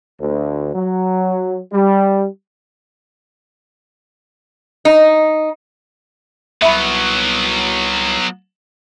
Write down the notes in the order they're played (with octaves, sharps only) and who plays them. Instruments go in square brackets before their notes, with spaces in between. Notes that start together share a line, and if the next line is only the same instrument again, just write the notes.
[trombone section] D2
F#3
G3
[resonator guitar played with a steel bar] D#4
[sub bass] C2 [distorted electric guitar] F#3 B3 [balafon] E5 B5